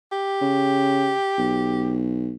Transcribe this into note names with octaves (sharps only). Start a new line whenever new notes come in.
G4
C#3
B1